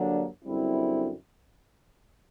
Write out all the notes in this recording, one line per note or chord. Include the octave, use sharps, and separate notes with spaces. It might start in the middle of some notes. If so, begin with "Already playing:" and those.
Already playing: G2 D3 F#3 A#3 D4
F#2 D3 G3 C4 E4